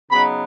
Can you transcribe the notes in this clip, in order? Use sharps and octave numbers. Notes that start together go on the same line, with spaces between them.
C#3 F#3 B3 D#4 B5